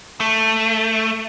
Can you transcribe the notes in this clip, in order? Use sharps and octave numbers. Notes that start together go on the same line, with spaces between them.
A3